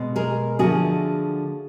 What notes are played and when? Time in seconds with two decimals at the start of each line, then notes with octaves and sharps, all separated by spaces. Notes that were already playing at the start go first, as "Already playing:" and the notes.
Already playing: B2 G#3
0.16 G#4 A#4
0.59 D3 F3 A3 F#4 G#4